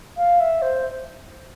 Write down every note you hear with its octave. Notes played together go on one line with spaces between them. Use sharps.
F5
E5
C5